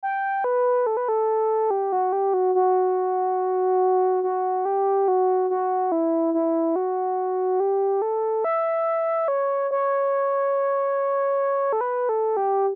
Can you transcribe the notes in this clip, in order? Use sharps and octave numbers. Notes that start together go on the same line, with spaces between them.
G5
B4
A4
B4
A4
G4
F#4
G4
F#4
F#4
F#4
G4
F#4
F#4
E4
E4
F#4
G4
A4
E5
C#5
C#5
A4
B4
A4
G4